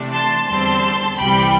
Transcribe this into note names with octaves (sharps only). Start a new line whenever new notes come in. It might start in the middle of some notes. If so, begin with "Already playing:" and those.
Already playing: C3 E3 A3 D4
A5 C6
E2 D3 G3 C4 A5 C6
C2 C3 E3 G3 G5 B5